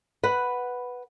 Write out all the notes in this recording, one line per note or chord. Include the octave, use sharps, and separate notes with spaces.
B4 F#5